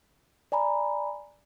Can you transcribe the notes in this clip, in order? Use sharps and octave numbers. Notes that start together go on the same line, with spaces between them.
D5 G#5 A#5 B5